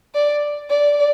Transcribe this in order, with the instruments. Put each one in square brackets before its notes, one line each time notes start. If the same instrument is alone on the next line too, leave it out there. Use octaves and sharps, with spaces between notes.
[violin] D5
D5